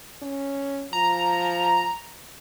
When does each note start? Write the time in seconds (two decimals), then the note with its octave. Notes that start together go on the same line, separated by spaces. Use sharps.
0.22 C#4
0.93 F3 A#5